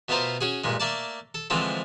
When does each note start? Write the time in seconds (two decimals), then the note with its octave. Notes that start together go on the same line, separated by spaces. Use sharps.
0.09 B2 A3 B3 F4 A#4 C5
0.41 C#4 F#4 G#4
0.64 G2 A#2 G#3
0.80 A3 A#3 D5 A5
1.34 A4
1.50 D3 E3 F3 G#3 A3 C4